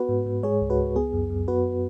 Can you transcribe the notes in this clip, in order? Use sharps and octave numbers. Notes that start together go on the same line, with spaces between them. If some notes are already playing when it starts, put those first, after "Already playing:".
Already playing: B3 F#4 B4
G#2
G#2
G#3 G#4 C#5
C#2
F#4 B4
C#2
B3 G#4
F#2
F#2
B3 F#4 B4